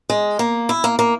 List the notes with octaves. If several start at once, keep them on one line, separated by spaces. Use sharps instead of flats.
G#3
A#3
E4
A#3
A#3